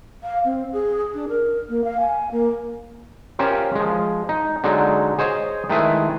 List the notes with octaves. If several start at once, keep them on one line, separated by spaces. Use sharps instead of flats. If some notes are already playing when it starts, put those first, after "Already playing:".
F5
C4
G#4
D4
A#4
A#3
F5
G#5
A#3
C#4 F4 G4 A#4 C5
F3 G#3
D#4
D3 F#3 G#3 D#4
G#4 C5 C#5 D#5
D#3 G#3 A3 E4 G#4 B4